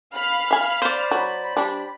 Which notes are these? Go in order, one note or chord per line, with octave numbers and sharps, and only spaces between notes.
F5 B5 F6
E5 G#5
C5 D5
F#3 B5
G3 D4